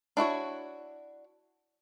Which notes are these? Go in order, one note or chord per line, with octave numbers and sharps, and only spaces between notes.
D4 E4 F#4 C#5